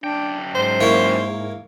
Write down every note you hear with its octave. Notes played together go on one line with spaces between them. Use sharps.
F#2 D4 G5
G#2 C5
A#3 E4 C#5